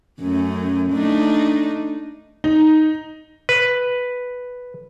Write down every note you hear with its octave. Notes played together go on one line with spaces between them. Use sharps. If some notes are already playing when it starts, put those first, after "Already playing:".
F#2 A3 C#4
A3 D4 D#4
D#4
B4